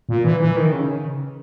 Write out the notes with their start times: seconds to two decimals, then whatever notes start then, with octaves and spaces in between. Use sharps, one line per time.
0.09 A#2
0.24 E3
0.40 E3
0.56 D#3
0.72 C#3